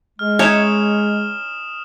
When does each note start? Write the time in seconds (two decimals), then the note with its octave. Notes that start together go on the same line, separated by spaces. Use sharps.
0.19 G#3 F6
0.39 C#4 D#4 E4 C#5 D#6 E7 G7